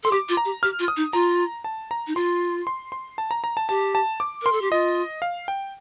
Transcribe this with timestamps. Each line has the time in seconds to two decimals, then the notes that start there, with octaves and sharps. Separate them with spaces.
0.04 A4 C6
0.11 G4 D6
0.29 F4
0.37 A#5
0.45 G4
0.63 G4 F6
0.79 F4
0.88 D#6
0.97 D#4
1.13 F4 A#5
1.64 A5
1.91 A#5
2.07 D#4
2.15 F4 C6
2.67 C6
2.92 C6
3.18 A5
3.31 A#5
3.44 A#5
3.57 A5
3.69 G4 A5
3.95 A5
4.20 D6
4.42 A#4 C6
4.52 A4
4.61 G4
4.71 F4 D#5
5.22 F5
5.48 G5